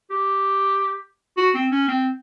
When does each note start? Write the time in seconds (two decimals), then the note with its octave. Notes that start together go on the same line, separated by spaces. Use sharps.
0.10 G4
1.37 F#4
1.54 C4
1.71 C#4
1.88 C4